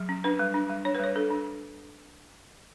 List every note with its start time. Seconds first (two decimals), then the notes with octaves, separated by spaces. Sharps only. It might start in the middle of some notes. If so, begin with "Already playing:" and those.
Already playing: F#3
0.09 C#4
0.24 D4 B4
0.39 G3
0.54 D4
0.70 G3
0.85 D4 C#5
0.95 B4
1.00 G3 C#5
1.15 D4 A4
1.30 D4